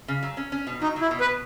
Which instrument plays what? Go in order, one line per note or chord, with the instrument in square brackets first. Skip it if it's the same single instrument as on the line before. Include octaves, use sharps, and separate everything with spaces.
[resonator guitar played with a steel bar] C#3
F#3
C#4
C#4
B2
[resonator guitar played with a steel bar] F#3 [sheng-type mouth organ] D#4
[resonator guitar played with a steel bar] F#3 [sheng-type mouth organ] E4
[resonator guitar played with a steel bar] B2
[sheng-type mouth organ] B4
[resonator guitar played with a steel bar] B2